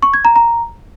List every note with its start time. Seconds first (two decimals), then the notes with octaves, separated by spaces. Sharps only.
0.03 C#6
0.14 G#6
0.25 A#5
0.36 A#5